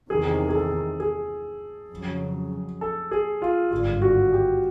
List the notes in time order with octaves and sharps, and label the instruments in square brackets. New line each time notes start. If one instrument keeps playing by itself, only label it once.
[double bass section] E2 C3 D#3 G#3 [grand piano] G#4
[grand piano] G#4
A4
G#4
[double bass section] F2 C#3 F#3
[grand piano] A4
G#4
F4
[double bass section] G#1 G2 D3 G3 [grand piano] F4
[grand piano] F#4
G4